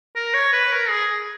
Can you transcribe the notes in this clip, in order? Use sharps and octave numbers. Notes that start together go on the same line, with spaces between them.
A#4
C#5
B4
A#4
G#4